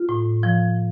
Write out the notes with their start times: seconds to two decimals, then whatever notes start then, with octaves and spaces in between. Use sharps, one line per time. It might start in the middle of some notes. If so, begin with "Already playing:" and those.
Already playing: F4
0.09 A2
0.43 F3